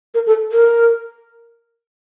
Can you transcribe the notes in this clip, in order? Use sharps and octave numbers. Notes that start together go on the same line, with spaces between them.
A#4
A4
A#4